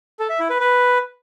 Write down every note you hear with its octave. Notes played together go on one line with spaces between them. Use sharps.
A4
E5
E4
B4
B4